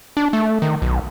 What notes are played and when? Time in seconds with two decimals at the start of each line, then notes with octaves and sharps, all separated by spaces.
0.17 D4
0.33 A3
0.62 D#3
0.82 B1